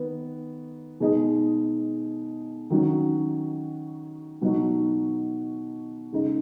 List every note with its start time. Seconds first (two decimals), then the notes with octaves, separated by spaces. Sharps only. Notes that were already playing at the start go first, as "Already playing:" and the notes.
Already playing: D#3 B3
1.00 B2 G#3 D#4 G#4
2.70 D#3 F#3 C#4 F#4
4.42 B2 F#3 D#4 F#4
6.13 C#3 G#3 D#4